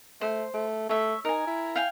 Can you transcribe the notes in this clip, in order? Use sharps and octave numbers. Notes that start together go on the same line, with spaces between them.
A3 C5
A3
A3 C#5 E5
D#4 A#4 G#5
E4
F5 G5 G#5